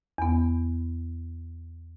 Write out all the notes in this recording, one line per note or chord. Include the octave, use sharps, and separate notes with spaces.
E2 B3